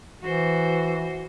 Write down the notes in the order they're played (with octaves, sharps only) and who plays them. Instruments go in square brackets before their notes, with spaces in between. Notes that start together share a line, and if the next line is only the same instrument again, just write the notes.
[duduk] E3 [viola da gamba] F#4 C5